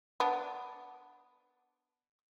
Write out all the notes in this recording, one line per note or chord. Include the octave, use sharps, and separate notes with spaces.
B3 D4